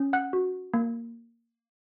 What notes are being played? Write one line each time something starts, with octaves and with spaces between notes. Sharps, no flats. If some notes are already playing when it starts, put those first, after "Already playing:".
Already playing: C#4
F#5 F#6
F#4
A#3